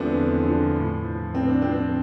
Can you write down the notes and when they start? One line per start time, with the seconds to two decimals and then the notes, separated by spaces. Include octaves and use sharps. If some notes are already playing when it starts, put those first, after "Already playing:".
Already playing: E2 D3 F3 A3 B3 C4 D4
0.13 E2
0.43 D3 F3
0.74 A2
1.04 F3
1.34 A2 C4
1.48 D4
1.62 F3 C4